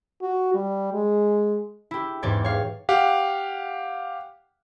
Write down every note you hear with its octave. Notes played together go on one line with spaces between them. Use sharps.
F#4
G3
G#3
E4 G4
E2 G#2 G4 C#5 D5
C#5 F5
G4 F5 F#5